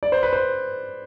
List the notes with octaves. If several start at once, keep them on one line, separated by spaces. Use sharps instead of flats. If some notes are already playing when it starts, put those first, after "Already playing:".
D5
C5
B4
C5